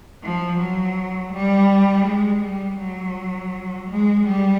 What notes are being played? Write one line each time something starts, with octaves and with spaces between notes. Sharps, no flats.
F3
F#3
G3
G#3
G3
F#3
G#3
G3